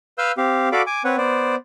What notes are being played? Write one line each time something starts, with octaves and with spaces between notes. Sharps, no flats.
B4 F5 E6 F6 G6
C4 G4 F5
F#4 A4 D5 F5 B5 D6
G#5 D6
C4 B4 C#5 F#5
B3 C5 D5